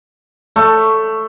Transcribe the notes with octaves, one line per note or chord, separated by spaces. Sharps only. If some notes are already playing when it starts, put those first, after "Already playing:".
A3